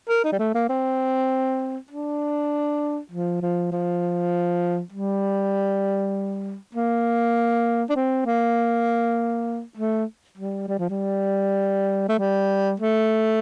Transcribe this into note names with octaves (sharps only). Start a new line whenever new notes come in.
A#4
D#4
G3
A3
A#3
C4
D4
F3
F3
F3
G3
A#3
D4
C4
A#3
A3
G3
G3
F3
G3
A3
G3
A3